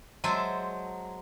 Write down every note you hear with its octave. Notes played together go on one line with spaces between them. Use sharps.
F#3 G#3 C5 E5 A5